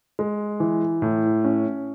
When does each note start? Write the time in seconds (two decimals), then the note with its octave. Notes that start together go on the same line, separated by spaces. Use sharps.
0.19 G#3
0.60 E3
1.02 A2
1.44 C#4